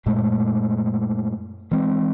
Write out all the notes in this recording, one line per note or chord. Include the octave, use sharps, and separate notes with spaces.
F#2 A#2 G#3 A3
E3 G#3 C4